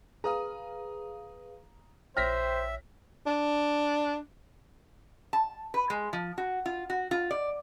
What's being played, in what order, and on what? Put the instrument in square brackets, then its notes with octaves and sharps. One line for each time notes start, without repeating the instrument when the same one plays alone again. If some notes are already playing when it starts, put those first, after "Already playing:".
[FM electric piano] G#4 B4 F5 [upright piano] A#5 D#6
[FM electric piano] A#1 C#5 G5 [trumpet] C5 [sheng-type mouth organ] E5 [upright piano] F6 A#6 B6
[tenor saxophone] D4
[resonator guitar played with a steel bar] A5
B4
G#3
F3
F#4
F4
F#4
F4
D5